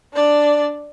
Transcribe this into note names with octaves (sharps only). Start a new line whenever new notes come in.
D4 D5